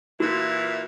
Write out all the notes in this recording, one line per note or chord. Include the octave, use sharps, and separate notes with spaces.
A#2 E3 F#4